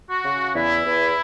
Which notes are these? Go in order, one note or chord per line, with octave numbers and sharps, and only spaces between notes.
F#4
C#3
E2 E4
E2